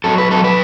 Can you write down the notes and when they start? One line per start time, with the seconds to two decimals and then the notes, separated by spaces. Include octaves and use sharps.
0.04 F#3 A4
0.18 B4
0.31 F#3 A4
0.44 B4